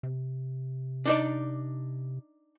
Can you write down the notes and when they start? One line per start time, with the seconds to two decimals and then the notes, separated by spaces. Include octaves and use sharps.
0.03 C3
1.06 D4 D#4 D5